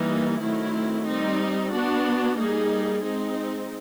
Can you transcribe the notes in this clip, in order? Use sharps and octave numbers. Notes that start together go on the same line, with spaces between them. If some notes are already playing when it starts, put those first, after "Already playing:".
Already playing: E3 G3 A#3 D#4
D#3 F#3 A3 C4 E4
G3 C4 D#4
B3 D4 F#4
G3 A#3 D#4 G#4
G#3 C4 D#4